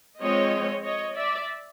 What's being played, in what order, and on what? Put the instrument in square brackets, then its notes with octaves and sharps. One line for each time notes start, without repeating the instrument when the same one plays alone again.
[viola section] F3 G#3 C4 C#5 D#5
C#5 D#5
D5 E5